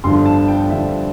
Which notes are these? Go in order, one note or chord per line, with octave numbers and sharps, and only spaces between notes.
G1 G2 D3 F3 C6
A5
G5
G1 G2 D3 F3 E5